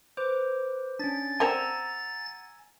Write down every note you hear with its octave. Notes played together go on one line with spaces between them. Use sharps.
B4 C5 D6
C#4 D4 A6
C4 D4 A#4 F#5 G#5 A#5 E6